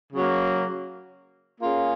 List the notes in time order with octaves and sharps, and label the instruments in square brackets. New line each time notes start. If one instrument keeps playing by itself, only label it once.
[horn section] C#3 F#3 A#3
A#3 C#4 F4 G#4